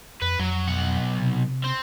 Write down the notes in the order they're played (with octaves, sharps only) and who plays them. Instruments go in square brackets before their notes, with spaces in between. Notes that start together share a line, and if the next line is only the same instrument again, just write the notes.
[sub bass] F2 [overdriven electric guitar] B4
[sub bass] F2 [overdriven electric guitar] F#3
[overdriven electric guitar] B1 F#5
[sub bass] C3
[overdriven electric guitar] C4